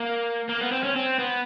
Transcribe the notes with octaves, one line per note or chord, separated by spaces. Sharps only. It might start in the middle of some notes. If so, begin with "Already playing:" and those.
Already playing: A#3
A#3
B3
C4
C#4
C4
B3